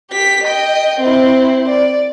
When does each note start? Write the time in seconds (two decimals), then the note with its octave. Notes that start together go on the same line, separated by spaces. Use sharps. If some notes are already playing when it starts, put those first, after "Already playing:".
0.11 G4 B6
0.43 D#5 G5
0.99 C4 E4
1.68 D5